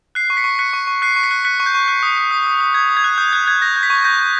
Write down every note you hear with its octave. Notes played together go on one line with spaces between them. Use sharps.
F#6 C7
C#6 C7
B6 C#7
C#6
F#6 B6 C#7
C#6
C#6
F#6 C7
C#6
B6 C#7
F#6
F#6 B6 C#7
C#6
G6
C#6
F#6
D#6
D#6
D#6
D#6
D#6
D#6 G#6
D#6
G#6
F#6
D#6 G6
F#6 G#6
F#6 G#6
G6 A#6
G6
B6
C#6
G6 A#6
G6